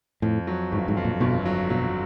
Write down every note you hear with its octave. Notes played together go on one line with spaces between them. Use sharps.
F2 A2
F#3
G1 G#2
G#2
F2
A#2
G1 B2
F#3
B2 F#3